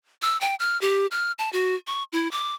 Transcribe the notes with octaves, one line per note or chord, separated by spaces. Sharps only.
E6
G5
F6
G4
F6
A5
F#4
C#6
E4
D6